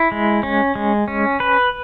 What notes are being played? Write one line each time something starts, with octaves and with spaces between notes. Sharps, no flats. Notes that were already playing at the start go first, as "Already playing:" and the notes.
Already playing: E4
G#3
C#4
G#3
C#4
B4